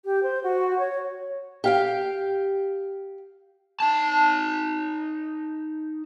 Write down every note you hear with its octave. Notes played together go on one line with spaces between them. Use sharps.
G4
C5
F#4
C#5
G4 F5 G5
D#4 A5